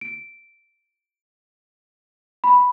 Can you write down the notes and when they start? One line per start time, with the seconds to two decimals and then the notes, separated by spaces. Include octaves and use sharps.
0.01 D7
2.44 B5